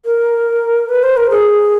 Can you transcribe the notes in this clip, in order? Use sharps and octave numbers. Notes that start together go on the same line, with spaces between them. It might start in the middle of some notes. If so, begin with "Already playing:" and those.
A#4
B4
C5
A#4
G#4